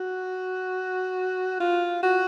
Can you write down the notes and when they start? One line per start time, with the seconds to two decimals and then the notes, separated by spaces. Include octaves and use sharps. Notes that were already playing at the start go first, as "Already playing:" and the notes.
Already playing: F#4
1.60 F4
2.03 F#4